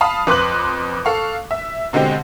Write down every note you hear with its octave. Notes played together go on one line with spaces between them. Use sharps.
F5 A5 B5 D#6
F2 B4 C6 D6 F#6 F#7
A4 F5 C#6
E5
B2 D3 G#3 C4 G4